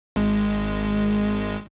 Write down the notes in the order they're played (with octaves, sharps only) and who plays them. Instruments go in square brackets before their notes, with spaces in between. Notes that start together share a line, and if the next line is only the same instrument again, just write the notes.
[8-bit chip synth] G#1 G#3